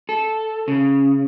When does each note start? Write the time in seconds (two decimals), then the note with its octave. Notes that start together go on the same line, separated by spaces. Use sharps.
0.09 A4
0.68 C#3